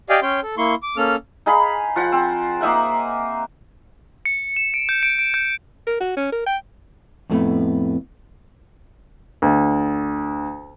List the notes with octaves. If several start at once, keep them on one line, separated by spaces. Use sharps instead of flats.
G4 D5 D#5 F5 G5 G#5
C#4 C#5 G5 C6
A4
A#3 E4 C6 C#6
D6
A#3 C#4 A4 F6
D#4 G#4 F5 B5
F3 F#5
C4
A#3 D#4 E5 F#5
C#7
E7
D7
G6
D7
D7
G6
A#4
F#4
C#4
A#4
G5
F2 A2 A3 B3
D2